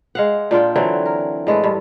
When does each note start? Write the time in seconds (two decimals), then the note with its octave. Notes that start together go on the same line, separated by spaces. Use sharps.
0.15 G#3 F5 F#5
0.51 A#2 D4 F4 G5
0.76 D3 E3 F#3 C4
1.06 A#4
1.47 A2 G#3 A4 B4
1.64 G2